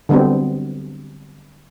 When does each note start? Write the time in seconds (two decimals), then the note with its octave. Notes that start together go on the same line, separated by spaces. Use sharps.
0.09 D3 F#3 G3 B3 C4